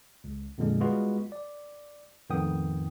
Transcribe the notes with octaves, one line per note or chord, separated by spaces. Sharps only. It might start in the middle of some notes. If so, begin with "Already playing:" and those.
C#2
F2 A#2 D3 G#3
G3 G#3 B3 F4 F#4 B4
D5
F2 A2 D#3 B3 G5 D#6